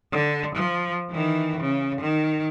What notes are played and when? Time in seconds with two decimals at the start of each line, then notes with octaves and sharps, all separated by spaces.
0.12 D3
0.56 F3
1.10 D#3 E3
1.61 C#3
2.01 D#3